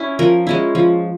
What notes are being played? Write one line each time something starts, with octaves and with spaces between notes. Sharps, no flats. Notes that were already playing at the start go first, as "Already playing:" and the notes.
Already playing: C#4 E4
F3 A#4
G#3 C#4 E4
F3